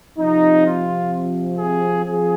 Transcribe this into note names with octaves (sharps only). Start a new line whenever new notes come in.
C3 F3 C4 D#4
F4
G#4
F3 C4 G#4